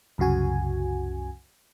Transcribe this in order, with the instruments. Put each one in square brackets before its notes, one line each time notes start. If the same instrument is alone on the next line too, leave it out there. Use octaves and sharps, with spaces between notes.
[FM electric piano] C2 F#2 C#3 F#4 G#5